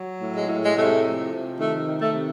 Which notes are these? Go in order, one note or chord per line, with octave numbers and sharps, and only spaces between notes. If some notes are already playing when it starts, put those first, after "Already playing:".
Already playing: F#3
A2
G#3
A2
G#3
C3 A3
F3
C3
D#3 A3
D#3
A3
C3